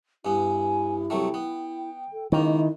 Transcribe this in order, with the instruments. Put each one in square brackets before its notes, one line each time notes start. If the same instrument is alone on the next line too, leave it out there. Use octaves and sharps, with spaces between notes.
[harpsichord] G2 B3 [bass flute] E4 [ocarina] G#5
[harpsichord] C2 F#3 A3 [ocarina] G5
[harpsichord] B3
[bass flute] A4
[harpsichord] C#2 A#3 [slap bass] D#3 [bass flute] E4 [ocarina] D#5